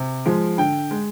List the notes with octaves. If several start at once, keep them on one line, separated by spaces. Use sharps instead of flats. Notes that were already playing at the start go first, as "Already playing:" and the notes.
Already playing: C3
F3 G#3
D3 G5
G#3